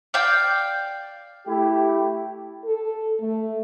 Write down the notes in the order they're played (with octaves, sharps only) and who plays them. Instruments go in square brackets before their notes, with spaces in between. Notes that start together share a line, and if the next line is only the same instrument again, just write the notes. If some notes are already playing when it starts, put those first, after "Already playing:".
[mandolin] D5 F5 G5
[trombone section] A3 E4 G4
[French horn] A4
A3